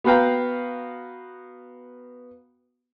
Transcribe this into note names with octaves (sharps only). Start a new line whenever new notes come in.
B3 F#4 B4 F5 G5 A#5